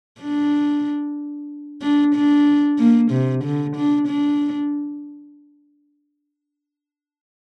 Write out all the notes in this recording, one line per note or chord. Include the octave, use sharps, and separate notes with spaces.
D4
D4
D4
A#3
C3
D3
D4
D4